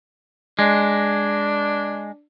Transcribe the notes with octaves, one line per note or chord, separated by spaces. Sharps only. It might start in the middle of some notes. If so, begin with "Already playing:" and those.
G#3 D4